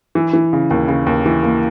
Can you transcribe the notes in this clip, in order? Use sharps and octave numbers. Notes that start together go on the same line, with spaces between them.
E3
E3
C#3
D#2
C#3
D#2
E3
A#3